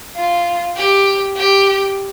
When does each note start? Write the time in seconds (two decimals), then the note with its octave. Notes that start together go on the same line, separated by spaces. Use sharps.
0.16 F4
0.76 G4
1.37 G4